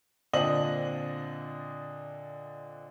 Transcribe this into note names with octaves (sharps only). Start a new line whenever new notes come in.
A#2 D3 C4 D4 D#5 F#7